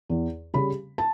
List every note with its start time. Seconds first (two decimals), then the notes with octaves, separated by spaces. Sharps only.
0.09 E2
0.54 C#3 G3 B5
0.98 A5